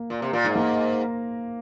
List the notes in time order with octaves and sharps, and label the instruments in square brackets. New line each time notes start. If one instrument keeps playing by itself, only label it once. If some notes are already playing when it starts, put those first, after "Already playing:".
Already playing: [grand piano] A#3
[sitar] A#2
C3
A#2
G#2
[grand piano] A#3